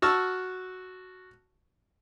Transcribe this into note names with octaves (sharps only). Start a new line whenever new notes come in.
F#4 A5 C#6 E6 F6